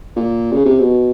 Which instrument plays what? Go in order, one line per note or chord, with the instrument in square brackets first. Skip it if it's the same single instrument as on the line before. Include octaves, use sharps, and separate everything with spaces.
[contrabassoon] A#2
C#3
C3
B2